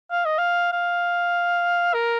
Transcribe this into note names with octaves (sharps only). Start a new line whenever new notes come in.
F5
D#5
F5
F5
A#4